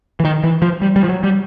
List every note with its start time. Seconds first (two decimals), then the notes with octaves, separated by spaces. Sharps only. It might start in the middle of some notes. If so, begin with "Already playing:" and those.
0.20 E3
0.25 D#3
0.43 E3
0.62 F3
0.82 G3
0.96 G3
1.04 F3
1.09 F#3
1.24 G3